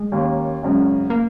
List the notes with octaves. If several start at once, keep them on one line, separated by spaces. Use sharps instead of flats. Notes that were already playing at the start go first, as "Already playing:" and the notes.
Already playing: G#3
D#2 D#3 A#3 C#4
G#1 F#2 C#3
A#3